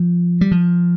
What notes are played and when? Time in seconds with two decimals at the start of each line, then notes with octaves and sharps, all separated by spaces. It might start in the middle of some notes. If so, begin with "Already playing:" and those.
Already playing: F3
0.41 G3
0.51 F3